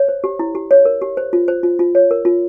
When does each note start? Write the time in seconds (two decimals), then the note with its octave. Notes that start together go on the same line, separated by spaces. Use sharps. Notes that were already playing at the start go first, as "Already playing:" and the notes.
Already playing: C#5
0.08 C5
0.24 G4
0.39 E4
0.55 G4
0.71 C#5
0.85 A#4
1.02 G4
1.17 C5
1.33 F4
1.48 C5
1.63 F4
1.79 F4
1.95 C#5
2.11 A#4
2.25 F4